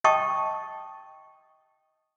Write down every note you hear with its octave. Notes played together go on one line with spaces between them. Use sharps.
D#5 G5 A5 C#6 D#6